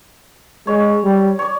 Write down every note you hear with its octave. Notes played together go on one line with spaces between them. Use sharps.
G#3 C#5
G3
C#5 D5